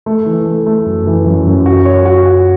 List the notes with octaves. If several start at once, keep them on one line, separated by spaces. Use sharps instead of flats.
A3
E3
A3
A3
F#2
E3
F#2
F#2
F#4
C#5
F#4
F#4